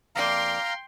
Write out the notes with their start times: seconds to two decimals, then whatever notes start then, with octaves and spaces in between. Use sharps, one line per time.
0.16 F2 A#3 D5 F5 G5 A#5 C6